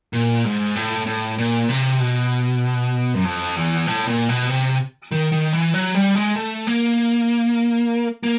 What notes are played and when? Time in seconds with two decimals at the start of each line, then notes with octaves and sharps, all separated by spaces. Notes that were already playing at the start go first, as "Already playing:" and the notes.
0.13 A#2
0.44 G#2
0.76 A2
1.06 A2
1.38 A#2
1.69 C3
2.00 B2
3.14 F#2
3.25 F2
3.56 E2
3.87 A2
4.08 A#2
4.29 B2
4.49 C3
5.11 D#3
5.32 D#3
5.53 E3
5.74 F#3
5.95 G3
6.15 G#3
6.36 A3
6.67 A#3
8.23 A#3